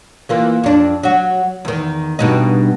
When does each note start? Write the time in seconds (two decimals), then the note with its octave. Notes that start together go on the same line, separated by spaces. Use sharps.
0.29 E3 A#3 F4
0.64 F2 D4
1.03 F#3 F#4
1.65 E2 D#3
2.19 G2 B2 D#4